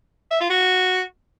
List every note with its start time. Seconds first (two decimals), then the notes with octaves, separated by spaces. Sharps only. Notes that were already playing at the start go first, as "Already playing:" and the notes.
0.31 E5
0.40 F4
0.50 F#4